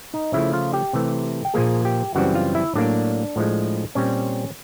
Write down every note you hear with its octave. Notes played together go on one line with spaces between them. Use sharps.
D#4 D#5
C#3 F3 A3 E4 E5
F4 F5
G4 G5
C3 E3 A3
G5
A#2 F3 A#3 G#4 G#5
G4 G5
F#2 C#3 E3 G3 C4 F#4 F#5
F4 F5
E4 E5
A2 F#3 A#3 D4 D5
A2 F3 G#3
A#2 G3 C4 C#4 C#5